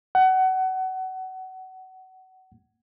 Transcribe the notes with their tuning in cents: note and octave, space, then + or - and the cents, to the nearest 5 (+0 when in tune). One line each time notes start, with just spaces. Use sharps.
F#5 +25